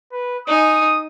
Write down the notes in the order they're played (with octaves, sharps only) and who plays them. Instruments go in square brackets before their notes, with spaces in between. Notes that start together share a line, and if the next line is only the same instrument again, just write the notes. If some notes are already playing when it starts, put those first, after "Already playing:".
[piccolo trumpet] B4
[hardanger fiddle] D#4 G#5 [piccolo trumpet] D#6